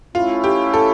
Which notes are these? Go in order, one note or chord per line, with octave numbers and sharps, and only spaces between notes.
A3 C#4 E4 F4
G4
A4